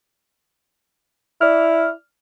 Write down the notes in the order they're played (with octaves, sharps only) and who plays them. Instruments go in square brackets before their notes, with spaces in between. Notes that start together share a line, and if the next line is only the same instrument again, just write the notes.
[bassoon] E4 [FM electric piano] D5 F6